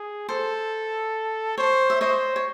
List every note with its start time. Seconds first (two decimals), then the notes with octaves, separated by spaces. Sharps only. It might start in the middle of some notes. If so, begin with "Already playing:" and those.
Already playing: G#4
0.29 A4 C5
1.58 C5 C#5
1.90 E5
2.01 C5 C#5 D#5
2.36 C#5